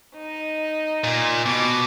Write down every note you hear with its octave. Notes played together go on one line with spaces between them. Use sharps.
D#4
A#2
B2 D6